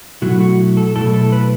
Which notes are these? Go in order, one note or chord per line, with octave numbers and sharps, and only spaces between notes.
B2 F#3 A3 E4 F#4
F#4
A4
B2 F#3 A3 E4 A4
A4
B4